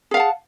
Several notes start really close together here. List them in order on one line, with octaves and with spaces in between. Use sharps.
G#4 F5 F#5 A5